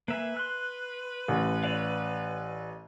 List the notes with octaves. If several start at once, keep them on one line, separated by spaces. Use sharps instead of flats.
A#3 B4 E5 G#5
C6 F#6
A1
C#5 D5 F5